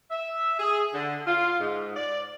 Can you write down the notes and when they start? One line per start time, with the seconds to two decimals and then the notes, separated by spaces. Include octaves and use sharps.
0.11 E5
0.59 G#4
0.93 D3
1.27 F4
1.60 G#2
1.96 D5